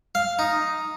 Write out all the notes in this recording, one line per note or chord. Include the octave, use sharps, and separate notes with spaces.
F5
D#4